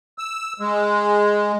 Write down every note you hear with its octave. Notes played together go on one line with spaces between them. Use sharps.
E6
G#3